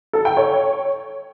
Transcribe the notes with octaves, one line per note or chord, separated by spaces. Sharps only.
A4
G5
C#5